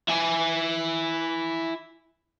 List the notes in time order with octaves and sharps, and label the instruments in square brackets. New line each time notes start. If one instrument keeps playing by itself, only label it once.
[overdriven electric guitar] E4 G#5